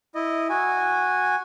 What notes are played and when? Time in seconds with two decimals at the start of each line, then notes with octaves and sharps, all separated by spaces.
0.15 E4 D#5
0.50 F#4 G#5